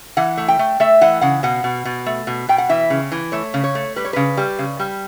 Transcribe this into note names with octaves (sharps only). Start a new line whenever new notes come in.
E3 F#5
A3
G5
A3
A3 E5
E3 F#5
C#3 F#5
B2 F#5
B2
B2
A3
B2
B2 G5
F#5
E3 E5
C#3
E3
A3 C#5
C#3
C#5
A3
G3 B4
C#5
C#3 B4
G3
C#3
G3